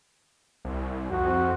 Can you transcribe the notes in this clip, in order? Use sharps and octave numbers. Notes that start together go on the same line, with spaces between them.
C2
F2 C4 F#4